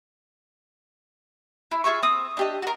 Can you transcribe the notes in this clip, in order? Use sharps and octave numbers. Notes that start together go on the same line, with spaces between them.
E4
F4 G#4 E5 C#6
C4 D#6
D4 G4 D#5
F#4 A#4